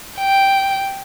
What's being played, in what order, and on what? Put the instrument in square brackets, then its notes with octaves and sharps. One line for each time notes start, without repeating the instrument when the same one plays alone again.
[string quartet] G5